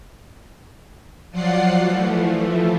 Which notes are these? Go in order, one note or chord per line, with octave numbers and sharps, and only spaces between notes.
F3 F#3 F4 D5 F#5 C7
E3 F3 A3